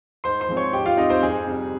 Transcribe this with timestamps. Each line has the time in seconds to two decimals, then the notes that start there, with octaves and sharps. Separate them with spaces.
0.24 G#2 C5 C6
0.41 C5 C6
0.48 F3 G#3 C4
0.57 C#5 C#6
0.73 G#2 G4 G5
0.86 F4 F5
0.97 G3 C4 D#4 D#5
1.10 C4 C5
1.23 F2 G#4
1.47 C3 G3